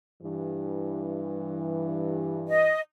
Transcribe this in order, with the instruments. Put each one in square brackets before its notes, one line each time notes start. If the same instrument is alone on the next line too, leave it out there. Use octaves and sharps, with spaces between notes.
[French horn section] G2 E3
[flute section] D#5